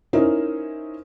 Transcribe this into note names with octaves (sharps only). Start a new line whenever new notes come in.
C#4 D#4 E4 A#4 C5